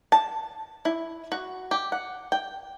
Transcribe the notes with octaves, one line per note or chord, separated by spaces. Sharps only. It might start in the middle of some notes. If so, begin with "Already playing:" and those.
A5
E4
F#4
G4
F#5
G5